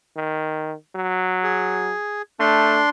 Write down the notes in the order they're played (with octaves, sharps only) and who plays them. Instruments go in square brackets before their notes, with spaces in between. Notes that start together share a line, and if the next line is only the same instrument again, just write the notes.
[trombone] D#3
F#3
[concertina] G#4
[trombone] A3 [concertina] D4 C6